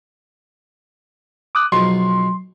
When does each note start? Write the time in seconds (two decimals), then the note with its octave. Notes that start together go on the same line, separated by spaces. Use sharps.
1.55 D6 D#6 F#6
1.72 B1 F3 G#3 C6